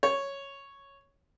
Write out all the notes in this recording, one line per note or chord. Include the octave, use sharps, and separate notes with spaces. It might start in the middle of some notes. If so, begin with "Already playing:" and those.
C#5